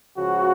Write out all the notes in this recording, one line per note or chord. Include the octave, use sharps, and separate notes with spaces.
C#2 C#3 F3 F#4